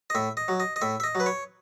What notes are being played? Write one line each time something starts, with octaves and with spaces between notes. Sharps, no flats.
D#5
A2 E5
D#5
F#3
D#5
D#5
A2 E5
E5
D#5
F#3
B4
C#5